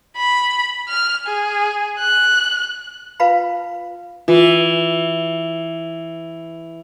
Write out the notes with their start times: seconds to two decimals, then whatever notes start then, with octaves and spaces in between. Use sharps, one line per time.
0.17 B5
0.89 F6
1.27 G#4
1.99 F#6
3.20 F4 B4 F5 A5 B5
4.28 E3 F4